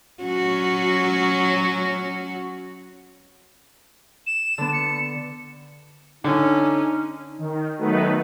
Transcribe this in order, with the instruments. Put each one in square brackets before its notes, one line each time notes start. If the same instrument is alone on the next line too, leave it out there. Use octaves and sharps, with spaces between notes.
[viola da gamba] F#3 C#4 F#4
[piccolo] E7
[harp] D3 B3
[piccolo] C#7
[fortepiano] D3 [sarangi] C#4 [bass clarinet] D#4
[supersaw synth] D#3
D#3 F#3 A3 B3 D#4 B4